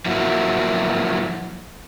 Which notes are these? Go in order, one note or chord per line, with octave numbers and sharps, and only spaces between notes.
F3 F#3 A#3 E4 F#4